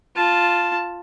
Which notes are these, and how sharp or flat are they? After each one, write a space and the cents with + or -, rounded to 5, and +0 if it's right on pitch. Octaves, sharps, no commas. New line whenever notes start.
F4 +0 A5 +0